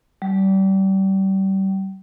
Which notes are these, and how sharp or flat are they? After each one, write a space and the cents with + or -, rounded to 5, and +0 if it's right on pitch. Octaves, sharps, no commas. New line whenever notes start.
G3 -30